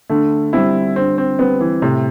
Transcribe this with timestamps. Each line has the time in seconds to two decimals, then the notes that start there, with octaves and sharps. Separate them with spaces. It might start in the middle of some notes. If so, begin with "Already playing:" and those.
0.10 D3 A3
0.53 G3 C4 E4
0.96 D3 C4
1.18 C4
1.39 G3 B3 C4
1.61 E3
1.82 A2 C3